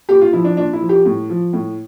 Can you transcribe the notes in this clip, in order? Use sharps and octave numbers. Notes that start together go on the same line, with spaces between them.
A#2 G4
F4
F3 E4
D4
A#2 D4
E4
F3
G4
A2
F3
A2